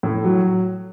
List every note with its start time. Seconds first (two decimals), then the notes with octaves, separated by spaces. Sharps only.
0.03 A2
0.24 F#3